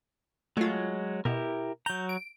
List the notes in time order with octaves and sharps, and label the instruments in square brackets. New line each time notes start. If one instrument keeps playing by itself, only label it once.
[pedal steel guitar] F#3 G#3 C#5 [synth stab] A3 F4
[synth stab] B2 [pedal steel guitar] E4 G4 A#4
[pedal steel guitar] F#3 A#5 [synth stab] G6
[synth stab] D7